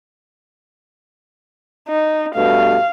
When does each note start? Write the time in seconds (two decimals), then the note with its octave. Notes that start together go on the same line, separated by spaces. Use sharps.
1.88 D#4
2.35 G2 B2 A3 F5